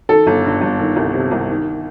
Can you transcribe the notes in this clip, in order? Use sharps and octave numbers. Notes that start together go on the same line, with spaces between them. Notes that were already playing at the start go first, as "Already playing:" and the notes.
D#3 A4
G1
G2
G1
D#3
C2
C3
C2
D#3